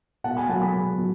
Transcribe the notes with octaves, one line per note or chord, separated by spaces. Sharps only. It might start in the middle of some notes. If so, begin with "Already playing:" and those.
B2 F#5 A5
G#5 B5
F#3 F#5 A5
G#5 B5
B2
F#3